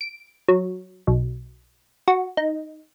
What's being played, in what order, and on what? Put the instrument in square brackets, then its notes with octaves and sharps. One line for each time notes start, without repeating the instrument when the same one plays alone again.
[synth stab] D7
F#3
B1
F#4
D#4